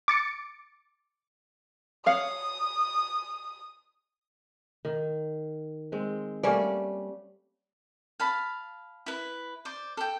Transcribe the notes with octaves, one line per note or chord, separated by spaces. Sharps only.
D6 A6 C#7 D7
C#5 F5 F#5 D#6
D#3
G#3 C4
G3 A3 A#3 C#4 D5
F5 A5 B5
E4 B4
C5 D5
A4 G5